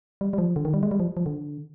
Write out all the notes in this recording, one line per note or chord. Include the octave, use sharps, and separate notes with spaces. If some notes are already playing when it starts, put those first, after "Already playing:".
G3
G3
F3
D3
D#3
G3
G#3
G3
F3
F3
D3